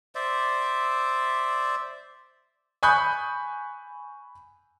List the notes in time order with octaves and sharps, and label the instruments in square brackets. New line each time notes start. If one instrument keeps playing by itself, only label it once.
[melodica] C5 D5 E5
[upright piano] G#5 B5 C#6 D#6 F#6 G6